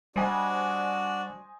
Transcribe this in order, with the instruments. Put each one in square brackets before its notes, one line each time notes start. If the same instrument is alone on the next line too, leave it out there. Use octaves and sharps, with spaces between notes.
[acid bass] G3 [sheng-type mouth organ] D4 F#4 D5 [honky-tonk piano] C5 D#5 G#5